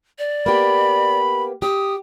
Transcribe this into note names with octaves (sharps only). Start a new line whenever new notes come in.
D5
A#3 B3 G4 B5
G4 D#6